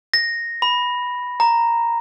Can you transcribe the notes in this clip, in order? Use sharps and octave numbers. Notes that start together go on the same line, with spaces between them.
A#6
B5
A#5